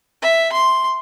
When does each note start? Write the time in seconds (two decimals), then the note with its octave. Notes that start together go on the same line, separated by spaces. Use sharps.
0.22 E5
0.52 C6